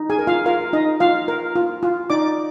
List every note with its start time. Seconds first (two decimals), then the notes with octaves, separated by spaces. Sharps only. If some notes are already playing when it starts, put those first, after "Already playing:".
Already playing: D#4
0.10 G#4 G#5
0.19 A#4
0.27 F4 F5
0.46 F4 A#4 F5
0.73 D#4 D#5
1.00 F4 F5
1.28 A#4
1.56 F4
1.83 F4
2.10 D#4 D5 D6